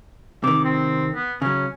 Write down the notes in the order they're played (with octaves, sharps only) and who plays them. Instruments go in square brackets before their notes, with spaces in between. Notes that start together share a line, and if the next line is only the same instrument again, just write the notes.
[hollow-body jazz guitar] C3 D#3 [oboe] D6
[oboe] C4
B3
[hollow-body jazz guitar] C#3 F#3 [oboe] C#4